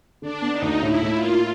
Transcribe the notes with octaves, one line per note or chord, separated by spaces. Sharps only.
D3 D4
B3
D#4
D2
A2 E4
A2
F4
A#3